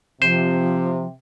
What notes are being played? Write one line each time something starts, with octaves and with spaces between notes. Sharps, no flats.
C3 F3 C5